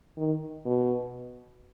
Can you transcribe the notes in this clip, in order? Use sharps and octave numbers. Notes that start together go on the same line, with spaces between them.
D#3
B2